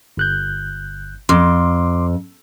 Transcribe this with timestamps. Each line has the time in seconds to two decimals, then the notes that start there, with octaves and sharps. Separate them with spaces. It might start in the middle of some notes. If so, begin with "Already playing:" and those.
0.17 G1 F#6 G6
1.29 F2 C6 D6